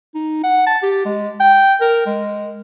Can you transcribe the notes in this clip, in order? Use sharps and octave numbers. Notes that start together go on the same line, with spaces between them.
D#4
F#5
A5
G4
G#3
G5
A#4
G#3